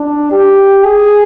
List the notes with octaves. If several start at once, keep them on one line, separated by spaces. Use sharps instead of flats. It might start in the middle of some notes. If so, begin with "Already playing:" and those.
Already playing: D4
G4
G#4